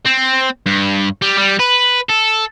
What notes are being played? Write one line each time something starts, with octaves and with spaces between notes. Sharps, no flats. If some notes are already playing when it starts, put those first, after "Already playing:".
C4
G2
G3
G3
B4
A4